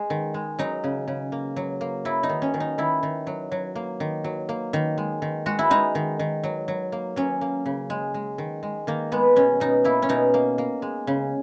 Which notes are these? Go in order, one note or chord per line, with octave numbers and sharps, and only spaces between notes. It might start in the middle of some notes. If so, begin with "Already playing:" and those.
Already playing: G#3
D#3
G#3
F#3 D#4
C#3
C#3
A#3
F#3
A#3
F#3 E4
D#4
D#3
C#4
D#3
D#4
D#3 E4
D#3
F#3
F#3
A#3
D#3
F#3
A#3
D#3
G#3
D#3
G#3 F#4
E4
G#3 D#4
D#3
D#3
F#3
F#3
A#3
F#3 C#4
A#3
C#3
G#3
G#3
D#3
G#3
D#3 A#3
G#3 B3
B2 C#4
B2 D#4
A#3 E4
C#4
B2 D#4
A#3
A#3
G#3
C#3